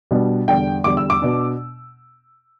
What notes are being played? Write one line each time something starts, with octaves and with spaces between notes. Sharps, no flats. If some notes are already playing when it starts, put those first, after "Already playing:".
B2 G3 B3 D4
E2 D3 G3 G5
E2 D3 G3 D6
E6
D6
B2 B3 D4